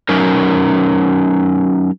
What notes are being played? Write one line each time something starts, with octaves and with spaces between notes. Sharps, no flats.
F#3 C#4 D#4 A#4